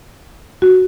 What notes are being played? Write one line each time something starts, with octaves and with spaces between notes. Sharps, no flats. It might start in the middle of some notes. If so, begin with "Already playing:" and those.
F#4